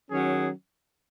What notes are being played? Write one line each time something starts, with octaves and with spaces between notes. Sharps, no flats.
D#3 F#3 C#4 G#4